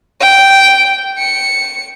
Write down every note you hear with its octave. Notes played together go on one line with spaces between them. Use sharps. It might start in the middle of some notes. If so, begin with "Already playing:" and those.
G5
C#7